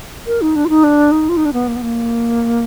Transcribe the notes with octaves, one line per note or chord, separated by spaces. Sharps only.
A#4
D#4
D4
F4
D#4
D4
D#4
F4
D#4
D4
B3
A#3
B3
A#3